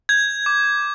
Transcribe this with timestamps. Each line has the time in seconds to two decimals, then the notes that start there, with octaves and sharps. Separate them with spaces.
0.09 G6 G#6
0.46 D6